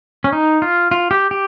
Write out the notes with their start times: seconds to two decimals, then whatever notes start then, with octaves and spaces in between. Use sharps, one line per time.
0.24 C#4
0.33 D#4
0.62 F4
0.91 F4
1.11 G4
1.31 G4